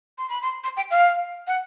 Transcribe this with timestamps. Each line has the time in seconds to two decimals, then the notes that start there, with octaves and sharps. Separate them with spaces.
0.18 C6
0.29 B5
0.42 C6
0.64 C6
0.77 G5
0.91 F5
1.47 F#5